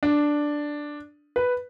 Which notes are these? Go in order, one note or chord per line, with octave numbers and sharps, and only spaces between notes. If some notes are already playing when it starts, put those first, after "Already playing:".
D4
B4